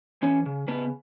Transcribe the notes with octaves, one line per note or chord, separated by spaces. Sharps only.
E3 C#4 C#5
C#3
C#3 B3 B4